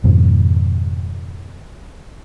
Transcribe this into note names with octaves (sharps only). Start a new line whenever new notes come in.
F2 G#2 B2 D#3